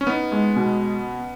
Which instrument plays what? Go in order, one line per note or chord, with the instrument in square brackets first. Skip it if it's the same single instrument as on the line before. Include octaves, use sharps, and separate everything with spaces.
[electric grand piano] C#4
[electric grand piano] B3 [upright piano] D#4
[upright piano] G#3
B2